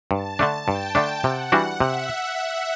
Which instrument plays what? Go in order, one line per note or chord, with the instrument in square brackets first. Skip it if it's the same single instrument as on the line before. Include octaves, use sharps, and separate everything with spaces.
[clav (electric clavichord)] G2 [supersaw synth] A5
[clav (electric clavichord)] D3 A3 D4
[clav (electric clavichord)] G2 [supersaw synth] G5
[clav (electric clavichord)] D3 A3 D4
[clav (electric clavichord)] C3 [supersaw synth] F#5
[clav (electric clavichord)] E3 G3 D4 F#4
[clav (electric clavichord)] C3 [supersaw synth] E5